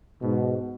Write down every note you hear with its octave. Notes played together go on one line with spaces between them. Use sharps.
G#2 B2